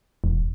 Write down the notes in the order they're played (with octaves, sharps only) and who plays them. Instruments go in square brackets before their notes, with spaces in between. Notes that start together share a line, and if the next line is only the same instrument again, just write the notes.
[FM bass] E1